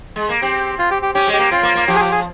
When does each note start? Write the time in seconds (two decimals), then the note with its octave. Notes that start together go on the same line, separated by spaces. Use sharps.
0.16 G#3
0.29 A#3
0.42 C4 G4
0.79 F4
0.91 G4
1.02 G4
1.15 C#4 G4
1.27 G#3
1.33 G4
1.39 A#3
1.51 C4 F4
1.63 A#3
1.75 A#3
1.88 F3 G4
1.96 G#4
2.00 G4
2.12 G#4